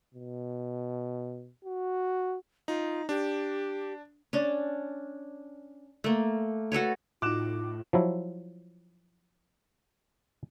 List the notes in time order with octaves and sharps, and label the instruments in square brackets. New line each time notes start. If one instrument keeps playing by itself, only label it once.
[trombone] B2
F#4
[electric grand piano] D#4 [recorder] F4
[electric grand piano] D4 [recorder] G4
[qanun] C#4 D4
A3 A#3
F#4 A4 B4 C#5
[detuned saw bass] A2 [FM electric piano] D#4 F#4 [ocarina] F4 [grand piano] D6 F#6 E7
[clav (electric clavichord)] F3 F#3 E4